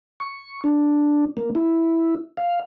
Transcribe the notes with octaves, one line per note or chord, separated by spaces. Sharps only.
C#6
D4
A#3
E4
F5